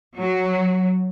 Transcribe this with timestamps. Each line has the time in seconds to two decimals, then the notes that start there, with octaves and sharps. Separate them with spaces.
0.18 F#3